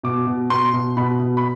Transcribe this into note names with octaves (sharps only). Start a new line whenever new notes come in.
B2 D6
B2
B2 C6
B2
B2 B5
B2
B5